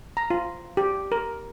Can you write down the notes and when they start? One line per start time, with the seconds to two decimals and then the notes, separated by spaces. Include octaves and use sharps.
0.17 A#5
0.30 F4
0.77 G4
1.12 A#4